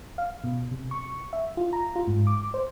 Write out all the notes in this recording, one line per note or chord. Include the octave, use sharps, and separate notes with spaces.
F5
B2
C3
C#6
E5
F4
A#5
F4
G#2
D6
C5